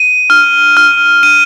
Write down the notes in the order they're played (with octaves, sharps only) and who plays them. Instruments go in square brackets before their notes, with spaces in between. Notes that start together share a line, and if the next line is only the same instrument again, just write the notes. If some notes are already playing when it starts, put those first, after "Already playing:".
Already playing: [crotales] D#7
F6
F6
D#7